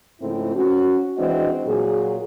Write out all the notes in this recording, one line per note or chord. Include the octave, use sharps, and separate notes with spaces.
G#2 C#3 F3 A3 C4 E4
C#4 F#4
E3 G#3 C4 D4 F#4 D#5
A#2 F#3 F#4 G#4